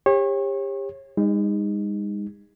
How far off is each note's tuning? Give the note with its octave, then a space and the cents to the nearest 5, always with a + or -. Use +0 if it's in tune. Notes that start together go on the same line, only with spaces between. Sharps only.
G4 +30 C#5 -30
G#3 -40 D#4 +0